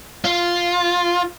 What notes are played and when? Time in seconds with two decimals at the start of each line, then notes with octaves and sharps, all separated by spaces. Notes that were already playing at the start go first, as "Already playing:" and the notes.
0.25 F4